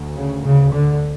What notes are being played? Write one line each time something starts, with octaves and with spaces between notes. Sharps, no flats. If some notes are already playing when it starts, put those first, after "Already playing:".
Already playing: D2
C#3
C#3
D3